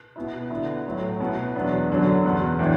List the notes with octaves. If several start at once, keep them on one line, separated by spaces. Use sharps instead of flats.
B2 B3 E4
D3 B3 E4
A2 F#3 A3 E4
B2 B3 E4
E2 B2 F#3 B3 D4
F#2 D3 F#3
E2 B2 B3
A2 E3 D4